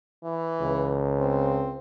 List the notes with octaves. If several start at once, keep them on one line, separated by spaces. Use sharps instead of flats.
E3
C#2
C4